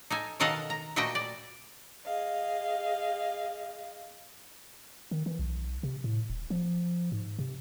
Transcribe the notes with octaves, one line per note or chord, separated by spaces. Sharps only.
D#4 A4 G#5
B2 D#3 A4 D#5 F5 F#5
A#5
A#2 A3 F#4 B4 D#5 G5
D5
G#4 D#5 F5
D#3
E3
B1
C3
A2
D#1
F3
G#2
C3